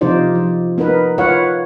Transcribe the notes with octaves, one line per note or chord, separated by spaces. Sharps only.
C3 F3 D#4 F4 C5 D5
F3
B3 D#4 A#4 B4
F4 B4 C#5 F5 F#5